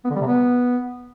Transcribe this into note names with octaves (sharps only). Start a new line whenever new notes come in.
B3
D3
G3
C3
B3